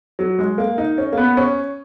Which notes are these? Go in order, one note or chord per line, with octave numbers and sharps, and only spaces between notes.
F#3
G#3
A#3
D#4
C#4
A#3
B3
C#4